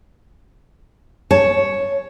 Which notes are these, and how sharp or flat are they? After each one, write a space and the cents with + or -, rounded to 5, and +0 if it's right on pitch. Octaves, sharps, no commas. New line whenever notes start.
C#5 +0 A5 +0